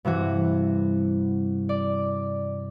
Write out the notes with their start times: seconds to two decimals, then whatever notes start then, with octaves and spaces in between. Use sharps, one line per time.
0.05 G2 C3 E3 F#4
1.69 D5